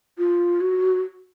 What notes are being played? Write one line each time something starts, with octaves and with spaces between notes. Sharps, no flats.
F4
F#4